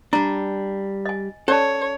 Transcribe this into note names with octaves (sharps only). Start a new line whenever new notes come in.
G3 D4 A#5
D#5 G#5
C#4 A4 C#5 D5 A5